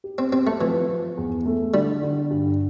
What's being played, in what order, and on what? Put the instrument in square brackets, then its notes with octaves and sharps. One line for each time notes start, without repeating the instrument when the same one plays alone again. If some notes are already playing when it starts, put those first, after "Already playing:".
[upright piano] G4
[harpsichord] C4
[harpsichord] C4 [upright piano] G4
[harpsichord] A3
[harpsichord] E3 [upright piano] F3
[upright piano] F3
E2
A3
[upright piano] D3 [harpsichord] G3
[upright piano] D3
G2